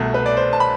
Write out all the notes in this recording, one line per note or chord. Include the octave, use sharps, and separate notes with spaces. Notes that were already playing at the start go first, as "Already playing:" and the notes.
Already playing: C2 B2 A3
B4
D5
C5
A5
B5